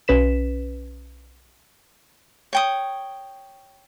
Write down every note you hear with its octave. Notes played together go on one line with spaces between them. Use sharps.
B1 C#4 B4 B6 E7
C#5 G5 D#6